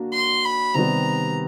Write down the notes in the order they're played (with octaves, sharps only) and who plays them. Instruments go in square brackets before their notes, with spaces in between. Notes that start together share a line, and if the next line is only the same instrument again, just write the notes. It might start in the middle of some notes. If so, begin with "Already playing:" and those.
Already playing: [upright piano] A#3 D4 F#4
[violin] C6
B5
[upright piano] C3 D#3 G3 B3 [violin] A#5